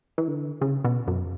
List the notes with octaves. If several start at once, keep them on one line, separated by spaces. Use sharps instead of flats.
E3
D3
C#3
B2
F#2